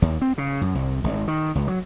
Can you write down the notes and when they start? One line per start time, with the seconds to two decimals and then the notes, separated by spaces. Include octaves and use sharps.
0.02 D#2
0.21 C4
0.38 C#3
0.61 F#2
0.75 C2
1.04 G#1
1.28 D#3
1.55 C#2
1.68 F#3